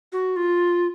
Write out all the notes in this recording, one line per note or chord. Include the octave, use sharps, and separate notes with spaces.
F#4
F4